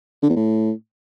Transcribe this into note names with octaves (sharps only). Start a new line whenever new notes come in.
D3
E2
A2